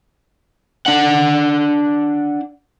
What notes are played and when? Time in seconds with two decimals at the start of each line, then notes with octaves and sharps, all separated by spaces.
0.86 D4 F#5